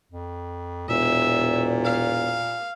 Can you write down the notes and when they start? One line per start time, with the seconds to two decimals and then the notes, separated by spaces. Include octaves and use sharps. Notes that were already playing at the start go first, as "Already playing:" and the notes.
0.12 F2
0.88 E1 A#2 E5
1.85 F5